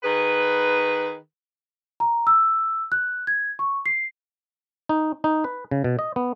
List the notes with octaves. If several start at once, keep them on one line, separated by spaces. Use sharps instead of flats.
D#3 G#4 B4
A#5
E6
F#6
G#6
C#6
C7
D#4
D#4
B4
C#3
B2
D#5
B3